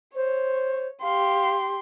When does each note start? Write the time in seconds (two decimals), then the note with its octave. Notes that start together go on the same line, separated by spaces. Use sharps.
0.16 C5 C#5
1.02 G4 F5 C6